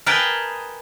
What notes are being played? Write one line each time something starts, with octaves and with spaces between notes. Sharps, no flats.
G#4 A#4 B4 D#5 G5 A5